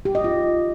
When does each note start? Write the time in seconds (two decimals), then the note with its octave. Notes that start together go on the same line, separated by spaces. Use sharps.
0.05 G4
0.15 D#5
0.24 F4